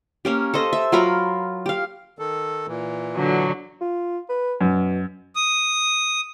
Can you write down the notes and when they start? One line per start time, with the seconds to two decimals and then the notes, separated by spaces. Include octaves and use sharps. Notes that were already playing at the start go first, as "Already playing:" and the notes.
0.25 A#3 C#4 G4
0.54 A4 C5 D#5
0.73 E5
0.92 F#3 F4 A#4 B5
1.66 G4 F5
2.19 D#3 A4
2.68 A#2 E3
3.15 D3 F#3
3.81 F4
4.29 B4
4.61 F#2 B2
5.35 D#6